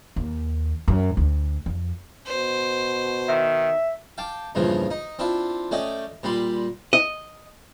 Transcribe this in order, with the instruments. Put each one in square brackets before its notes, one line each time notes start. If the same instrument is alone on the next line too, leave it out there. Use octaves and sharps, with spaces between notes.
[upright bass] D#2
F#2
D2
F2
[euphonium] B2 [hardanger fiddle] C5
[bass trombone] D#3 [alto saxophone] E5
[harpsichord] F5 G5 A5 D6
E2 G2 A#2 C#3 F3
D#4
C4 D4 E4 F4
A3 C#4 D5 D#5 G5
A#2 G3 D5 B5 C6
[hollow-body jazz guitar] D#5